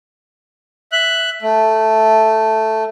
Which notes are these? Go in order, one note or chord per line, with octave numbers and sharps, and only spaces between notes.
E5 F#6
A3